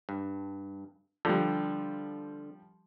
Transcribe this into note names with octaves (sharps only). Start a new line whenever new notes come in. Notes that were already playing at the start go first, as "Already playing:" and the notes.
G2
D3 F3 G3